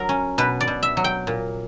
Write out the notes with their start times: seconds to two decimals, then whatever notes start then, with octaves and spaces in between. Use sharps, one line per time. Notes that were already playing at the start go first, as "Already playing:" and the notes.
Already playing: F#3 A#4
0.09 C#4
0.38 B2 B4
0.61 D5
0.67 B2
0.83 E5
0.97 F#3
1.04 G5
1.27 A#2